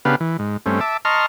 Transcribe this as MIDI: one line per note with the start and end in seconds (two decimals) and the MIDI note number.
0.05 0.16 49
0.05 0.16 59
0.05 0.16 62
0.05 0.16 67
0.05 0.16 71
0.05 0.16 77
0.20 0.37 52
0.39 0.57 44
0.66 0.80 43
0.66 0.80 57
0.66 0.80 60
0.66 0.80 61
0.81 0.97 76
0.81 0.97 81
0.81 0.97 86
1.05 1.26 75
1.05 1.26 81
1.05 1.26 82
1.05 1.26 84
1.05 1.26 85
1.05 1.26 89